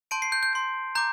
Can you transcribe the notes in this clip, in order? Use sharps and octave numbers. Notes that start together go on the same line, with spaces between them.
A5 C6 G6 D7
C7
G6
G6
C6 G6
A#5 D6 G6